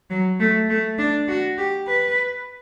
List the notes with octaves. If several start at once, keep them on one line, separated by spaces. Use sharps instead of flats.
F#3
A3
A3
D4
F#4
G4
B4